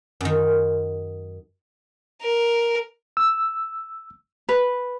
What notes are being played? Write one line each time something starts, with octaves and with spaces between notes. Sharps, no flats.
F#2 D#3
A#4
E6
B4